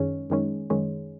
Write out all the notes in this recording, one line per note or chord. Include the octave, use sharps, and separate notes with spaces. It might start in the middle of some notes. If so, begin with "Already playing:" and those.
Already playing: F#2 D#3 G#3 C#4
F#2 D#3 G#3 C#4
F#2 D#3 G#3 C#4